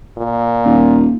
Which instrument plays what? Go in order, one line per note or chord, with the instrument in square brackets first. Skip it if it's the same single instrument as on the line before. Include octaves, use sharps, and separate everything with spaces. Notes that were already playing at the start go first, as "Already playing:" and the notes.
[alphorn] A#2
[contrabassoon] D#1